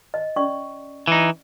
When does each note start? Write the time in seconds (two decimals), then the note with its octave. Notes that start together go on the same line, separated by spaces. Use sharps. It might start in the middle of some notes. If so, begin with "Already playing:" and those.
0.14 D#5
0.36 C#4 D5 C#6
1.07 E3 D#4